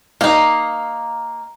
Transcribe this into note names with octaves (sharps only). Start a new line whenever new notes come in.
A#3 D#4 F5 A#5